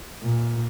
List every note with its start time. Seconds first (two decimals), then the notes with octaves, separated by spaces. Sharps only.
0.23 A#2